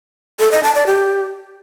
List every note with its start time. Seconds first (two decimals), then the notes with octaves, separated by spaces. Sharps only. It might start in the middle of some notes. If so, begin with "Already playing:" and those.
0.40 A4
0.51 D#5
0.63 A5
0.75 D5
0.87 G4